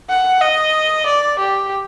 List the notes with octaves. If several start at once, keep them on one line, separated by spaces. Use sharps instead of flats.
F#5
D#5
D5
G4